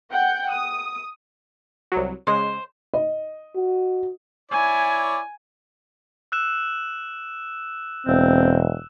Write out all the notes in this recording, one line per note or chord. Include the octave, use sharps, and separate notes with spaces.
F#5 G5 G6
D#6
C2 F#3
C#3 G#3 C5
D#5
F#4
E4 C#5 D5 G#5
E6 F#6 E7
E1 C4